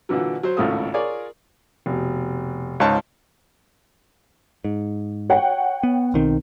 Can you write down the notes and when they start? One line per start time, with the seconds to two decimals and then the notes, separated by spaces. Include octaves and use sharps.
0.09 A#2 D3 E3 F#3
0.43 F#3 C5
0.57 G#1 C#2 A2 C#3 A4 D#6
0.94 F4 G#4 A#4 C#5 D5
1.86 F1 B2
2.80 C#2 G#2 D#4 F4 C#5 A5
4.65 G#2
5.30 C#5 F#5 G5
5.83 B3
6.14 B1 D#3 C4